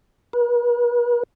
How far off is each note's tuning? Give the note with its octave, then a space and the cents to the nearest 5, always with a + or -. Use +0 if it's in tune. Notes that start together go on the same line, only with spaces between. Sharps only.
B4 -45